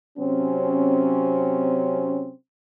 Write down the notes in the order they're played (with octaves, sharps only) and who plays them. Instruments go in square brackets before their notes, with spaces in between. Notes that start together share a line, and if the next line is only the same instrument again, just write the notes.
[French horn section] C3 F#3 C4 C#4